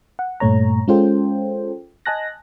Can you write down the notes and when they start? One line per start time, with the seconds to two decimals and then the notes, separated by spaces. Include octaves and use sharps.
0.19 F#5
0.40 G2 A#2 A3 C#5 A#5
0.88 G#3 C#4 F4 A4 C5 G5
2.06 D#5 G#5 A5 F#6 A#6